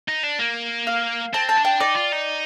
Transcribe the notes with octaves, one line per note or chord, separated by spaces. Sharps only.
D#4
D4
A#3
F5
C4 A5
A5
D4
G5
D#4 D5
F4
D#4